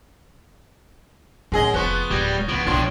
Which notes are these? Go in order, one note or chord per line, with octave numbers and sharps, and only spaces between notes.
F#2 A2 D#3 G#4 D#5
F1 F3 B3 C4 C#6 F#6 G7
D1 G3 D#6 G#6 A#6
C2 F3 B3 A#6 D7 F#7
B1 A2 F3 D4 F4